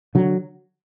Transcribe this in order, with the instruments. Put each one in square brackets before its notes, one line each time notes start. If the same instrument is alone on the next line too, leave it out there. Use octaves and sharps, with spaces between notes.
[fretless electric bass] D3 F#3